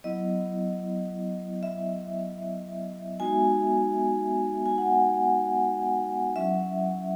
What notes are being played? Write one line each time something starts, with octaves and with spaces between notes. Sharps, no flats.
F#3 B3 E4 D#5
E5
G#3 B3 D#4 F#4 G#5
G#5
F#5
F#3 C#4 E4 E5